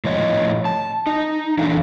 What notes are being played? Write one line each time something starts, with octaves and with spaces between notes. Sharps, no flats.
A2 F3 C#5 D#5
A5
D#4
E2 E3 F#3 D4 A4 F5